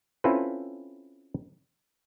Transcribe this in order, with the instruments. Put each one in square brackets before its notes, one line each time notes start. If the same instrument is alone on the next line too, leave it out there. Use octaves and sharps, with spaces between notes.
[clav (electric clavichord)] C4 C#4 E4 F4 A4 B4